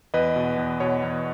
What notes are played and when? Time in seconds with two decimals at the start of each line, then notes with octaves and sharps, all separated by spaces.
0.14 E2 B4 D#5
0.36 B2
0.58 E2
0.80 B2 C#5
1.04 E2